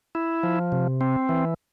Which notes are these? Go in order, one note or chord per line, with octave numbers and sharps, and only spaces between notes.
E4
F3
C3
C4
E3